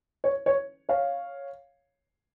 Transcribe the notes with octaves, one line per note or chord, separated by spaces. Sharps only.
C#5
C#5
C#5 F5